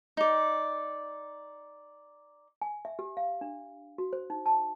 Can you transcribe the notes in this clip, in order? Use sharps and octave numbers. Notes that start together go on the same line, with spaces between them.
D#4 D5
G#5
E5
G4
F5
D4
F#4
C5
D#4
A5